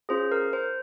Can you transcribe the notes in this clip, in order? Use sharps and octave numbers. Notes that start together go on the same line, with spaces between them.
C#4 F4 G#4 C5
A#4
C5